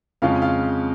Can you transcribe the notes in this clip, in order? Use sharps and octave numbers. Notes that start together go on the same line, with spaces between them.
F2 C#3 G#3 C#4 F4 F5
F4 F5